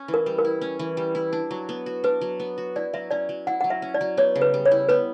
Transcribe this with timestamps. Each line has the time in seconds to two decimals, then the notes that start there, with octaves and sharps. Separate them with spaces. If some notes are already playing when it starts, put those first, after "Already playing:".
Already playing: C#4
0.08 E3
0.14 A#4
0.26 G3
0.39 A#4
0.45 E4
0.61 C#4
0.79 E3
0.97 G3
1.15 E4
1.33 D4
1.51 F#3
1.69 B3
1.86 F#4
2.04 D4 B4
2.21 F#3
2.40 B3
2.58 F#4
2.76 E4 D5
2.94 F#3 E5
3.11 C#4 D5
3.29 F#3
3.47 E4 F#5
3.61 F#3 F#5
3.70 E5
3.82 C#4
3.94 D5
4.01 F#3
4.17 B3 C#5
4.36 C#3
4.42 B4
4.54 G3
4.65 C#5
4.71 E4
4.89 B3 B4